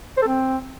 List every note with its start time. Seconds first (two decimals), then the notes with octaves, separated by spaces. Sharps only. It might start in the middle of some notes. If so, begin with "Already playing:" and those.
0.17 C5
0.22 A4
0.27 C4